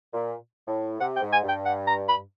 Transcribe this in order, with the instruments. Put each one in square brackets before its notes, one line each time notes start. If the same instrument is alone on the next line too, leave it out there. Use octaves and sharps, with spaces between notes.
[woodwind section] A#2
A2
[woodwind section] C3 [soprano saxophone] F#5
[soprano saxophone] G5
[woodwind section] G#2
[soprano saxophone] G#5
[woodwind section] G2 [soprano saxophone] G5
[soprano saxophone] F#5
A#5
B5